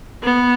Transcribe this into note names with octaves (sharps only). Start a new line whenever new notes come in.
B3